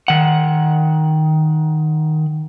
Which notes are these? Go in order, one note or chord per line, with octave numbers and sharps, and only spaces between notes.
D#3 F#5